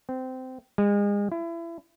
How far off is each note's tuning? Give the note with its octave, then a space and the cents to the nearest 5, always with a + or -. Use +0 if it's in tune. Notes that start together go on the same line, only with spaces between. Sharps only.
C4 -20
G#3 -35
E4 +30